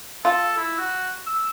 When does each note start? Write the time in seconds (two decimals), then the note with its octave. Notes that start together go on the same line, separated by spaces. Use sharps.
0.25 F4 A4
0.57 E4
0.78 F#4
1.27 E6